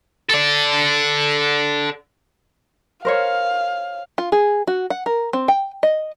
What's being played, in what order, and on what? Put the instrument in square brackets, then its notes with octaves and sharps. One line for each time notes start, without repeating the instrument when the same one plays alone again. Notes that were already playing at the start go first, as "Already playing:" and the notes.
[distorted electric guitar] A4 D5
[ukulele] A#4 C5 C#5 [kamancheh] F5
[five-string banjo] F4
G#4
F#4
F#5
A#4
C4
G5
D#5